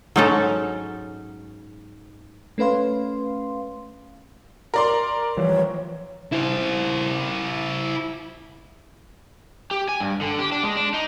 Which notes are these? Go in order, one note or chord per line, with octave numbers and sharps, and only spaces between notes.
G#2 F#3 C#4 D#4 A4
A3 C#4 B4 F5 C6
A#4 D5 C6
E3 F3 G3 C#5
E4 C5
G4
G#5
G2
D3
G4
D4
G#3
D4
D#4